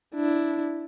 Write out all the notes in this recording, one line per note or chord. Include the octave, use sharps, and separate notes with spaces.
D4 E4